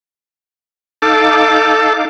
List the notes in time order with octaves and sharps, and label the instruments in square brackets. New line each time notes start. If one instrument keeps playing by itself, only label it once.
[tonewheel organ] D#4 F5 D6 [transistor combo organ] A4